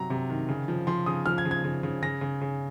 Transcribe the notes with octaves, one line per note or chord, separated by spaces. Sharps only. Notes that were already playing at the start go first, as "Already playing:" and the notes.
Already playing: C3 F#3 A#5
C3
D#3
C#3
F3
F3 C6
C#3 D#6
F3 F6
G#6
C#3
G#6
C#3
C#3
C#3 A#6
C#3
C#3